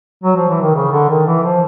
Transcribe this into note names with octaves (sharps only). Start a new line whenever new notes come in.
F#3
F3
E3
D#3
C#3
D3
D#3
E3
F3